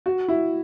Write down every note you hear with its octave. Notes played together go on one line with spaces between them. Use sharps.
F#4
E4